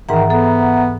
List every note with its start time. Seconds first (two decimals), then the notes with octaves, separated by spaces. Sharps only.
0.09 G#2 D#3 E3 E5 F#5 A#5
0.30 B3 A4